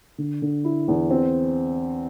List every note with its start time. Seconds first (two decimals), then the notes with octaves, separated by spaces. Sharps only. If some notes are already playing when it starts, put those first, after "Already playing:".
0.18 D3
0.42 D3
0.64 E4
0.88 E2
1.11 C4